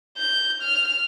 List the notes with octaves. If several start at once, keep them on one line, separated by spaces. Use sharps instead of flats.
G6
F6